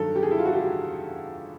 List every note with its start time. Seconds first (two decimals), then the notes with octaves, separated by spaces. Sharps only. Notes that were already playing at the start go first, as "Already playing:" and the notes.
Already playing: G2 D#3 F#3 A4
0.16 G4
0.23 G#4
0.31 E4
0.38 F4
0.45 F#4
0.53 G4